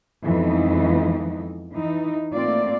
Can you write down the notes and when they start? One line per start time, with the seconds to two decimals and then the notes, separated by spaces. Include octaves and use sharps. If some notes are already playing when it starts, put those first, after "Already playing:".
0.23 F2 E3 G#3 B3 D#4
1.72 E3 D#4
2.33 A3 A#3 C4 F4 D5